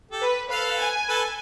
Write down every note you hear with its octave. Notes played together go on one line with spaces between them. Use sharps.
G4 A4
B4
A4 B4 F5
G#5
A4 B4